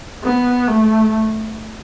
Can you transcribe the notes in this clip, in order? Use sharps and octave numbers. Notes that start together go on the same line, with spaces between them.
B3
A3